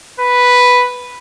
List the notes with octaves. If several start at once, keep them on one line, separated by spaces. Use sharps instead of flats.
B4